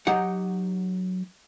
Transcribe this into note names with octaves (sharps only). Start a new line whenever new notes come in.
F#3 D#4 G4 F#5